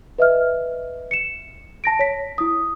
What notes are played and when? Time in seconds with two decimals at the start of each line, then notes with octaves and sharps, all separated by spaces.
0.18 B4 D#5 E5 F6
1.11 C#7 E7
1.84 A5 A#6 D7
1.99 C#5 B6
2.38 E4 D#6